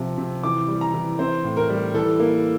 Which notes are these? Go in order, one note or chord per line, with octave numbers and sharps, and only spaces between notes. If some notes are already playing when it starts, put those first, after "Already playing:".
Already playing: C3 F3
C3
E3 D6
G3
A#5
E3
C4 C5
A2
A#4
G3
E3 A4
A#3